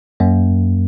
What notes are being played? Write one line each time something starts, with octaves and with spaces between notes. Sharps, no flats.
F#2 A#3